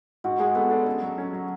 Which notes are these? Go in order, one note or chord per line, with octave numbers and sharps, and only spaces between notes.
G#2 F#4
G#3 G#4
B3 A4
D4 A4
C#4 A4
F#3
C#4
F#3